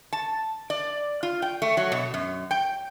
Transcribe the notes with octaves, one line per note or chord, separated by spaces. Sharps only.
A5
D5
F4
G5
A3
F#3
B2
F#2
G5